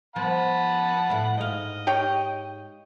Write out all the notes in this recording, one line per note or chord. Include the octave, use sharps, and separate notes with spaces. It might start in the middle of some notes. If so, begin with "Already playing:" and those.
F3 F#5 A5 B5
A2 E4
G#2 D#5 F5
G4 C#5 G5